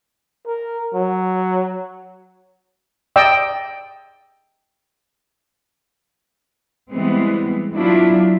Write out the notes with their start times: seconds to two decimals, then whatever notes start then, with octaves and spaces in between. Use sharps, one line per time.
0.47 A#4
0.94 F#3
3.16 D5 D#5 G5 E6
6.91 E3 G3 G#3 B3 C4
7.74 F#3 B3 D4 E4 F4